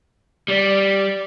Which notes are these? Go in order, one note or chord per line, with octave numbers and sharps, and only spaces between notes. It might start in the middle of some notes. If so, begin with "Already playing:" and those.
G3 D5